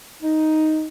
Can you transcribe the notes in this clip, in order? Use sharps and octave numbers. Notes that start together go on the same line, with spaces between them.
D#4